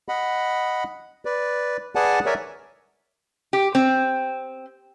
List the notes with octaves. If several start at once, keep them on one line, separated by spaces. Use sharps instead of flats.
D#5 F#5 B5
B4 D5
G#4 B4 D5 F#5 G#5 A5
A#4 C#5 D5 E5 G#5
G4
C4